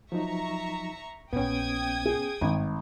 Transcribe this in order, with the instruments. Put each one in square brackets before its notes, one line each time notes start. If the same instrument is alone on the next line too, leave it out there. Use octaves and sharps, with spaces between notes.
[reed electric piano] F3 F#3 D#4 [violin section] E5 A#5 C#6
[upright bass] A#1 A#2 [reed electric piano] B3 C#4 [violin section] G5 D#6 G#6
[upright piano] G#4
[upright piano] G#1 [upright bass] G2